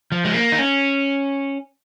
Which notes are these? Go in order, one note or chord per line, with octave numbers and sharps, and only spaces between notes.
F3
G#3
A#3
D#4
C#4